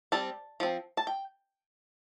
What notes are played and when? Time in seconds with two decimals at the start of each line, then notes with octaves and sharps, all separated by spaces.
0.12 G3 C4 A5
0.60 F3 C4
0.97 A5
1.07 G5